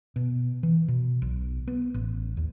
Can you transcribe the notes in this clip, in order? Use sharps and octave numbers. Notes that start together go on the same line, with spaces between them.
B2
E3
B2
B1
B3
A1
D#2